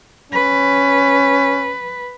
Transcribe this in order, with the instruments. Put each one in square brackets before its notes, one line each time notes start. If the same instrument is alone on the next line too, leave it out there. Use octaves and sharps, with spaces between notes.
[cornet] C#4 [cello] B4